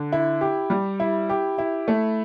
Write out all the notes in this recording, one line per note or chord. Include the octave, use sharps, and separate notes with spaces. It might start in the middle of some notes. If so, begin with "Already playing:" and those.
Already playing: D3
E4
G4
G3
E4
G4
E4
A3